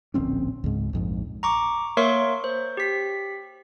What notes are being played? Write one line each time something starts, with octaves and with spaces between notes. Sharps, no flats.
D1 A#1 C4 C#4
C#2 G#2
A#1 F2 G#2
A#5 C#6 D6
A#3 A#4 C#5 E5 C6 C#6
C5
G4 B6